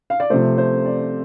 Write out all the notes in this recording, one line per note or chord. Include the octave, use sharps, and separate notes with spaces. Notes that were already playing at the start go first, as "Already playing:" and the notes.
F5
D5
C3 F3 A3 C5
C5
D5